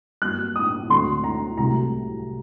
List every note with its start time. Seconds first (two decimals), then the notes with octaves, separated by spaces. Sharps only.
0.22 G2 F#3 A#3 F#6
0.56 D#6
0.89 D2 D3 F#3 A3 C4 C6
1.24 A#5
1.57 C2 C3 F#3 A3 A#5